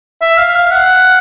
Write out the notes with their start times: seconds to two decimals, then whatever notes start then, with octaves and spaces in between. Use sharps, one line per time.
0.21 E5
0.38 F5
0.55 F5
0.72 F#5